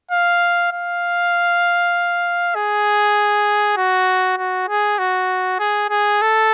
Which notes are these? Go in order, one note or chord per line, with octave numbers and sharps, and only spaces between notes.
F5
F5
G#4
F#4
F#4
G#4
F#4
G#4
G#4
A4